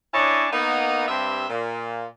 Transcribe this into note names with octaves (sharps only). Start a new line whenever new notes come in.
C#4 D4 E4 C#5 D#5 A5
A#3 B3 D#4
G2 C4 E5
A#2